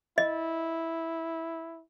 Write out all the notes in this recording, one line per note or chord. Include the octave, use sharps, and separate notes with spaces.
E4 D#5